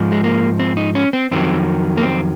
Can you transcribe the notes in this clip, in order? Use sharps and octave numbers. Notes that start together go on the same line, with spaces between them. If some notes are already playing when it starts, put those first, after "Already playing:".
Already playing: G#2 F3
G#3
A#3
C4
D#4
C#4
C4
F2 D#3 F#3 C4
A#3
C4